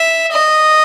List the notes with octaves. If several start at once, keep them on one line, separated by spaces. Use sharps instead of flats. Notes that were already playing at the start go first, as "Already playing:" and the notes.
Already playing: E5
D#5